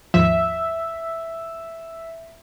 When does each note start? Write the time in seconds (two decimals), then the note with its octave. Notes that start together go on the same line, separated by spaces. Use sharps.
0.14 D#2 G#2 F3 E5